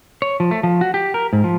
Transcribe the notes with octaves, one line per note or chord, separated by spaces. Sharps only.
C#5
F3
A3
F3
F#4
G4
A#4
G#2
F3